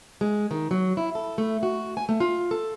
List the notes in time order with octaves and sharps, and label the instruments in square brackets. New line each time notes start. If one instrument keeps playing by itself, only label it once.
[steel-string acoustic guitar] G#3
D#3
F#3
E4
A4
A3
F#4
G#5
A3
F4
A4